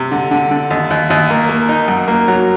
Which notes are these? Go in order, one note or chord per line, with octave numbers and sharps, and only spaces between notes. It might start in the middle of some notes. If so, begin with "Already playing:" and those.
Already playing: C3
D3
D3
D3
D#2
D#2
D#2
A#3
A#3
D#4
F#2
A#3
F#3